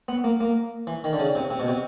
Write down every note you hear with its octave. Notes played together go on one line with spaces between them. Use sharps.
B3
A#3
A#3
E3
D#3
D3
C#3
C3
C3
B2
C3